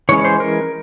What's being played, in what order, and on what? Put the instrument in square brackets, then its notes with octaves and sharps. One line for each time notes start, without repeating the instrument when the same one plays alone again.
[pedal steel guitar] E3 G#3 C#4 C#5
C5
A#4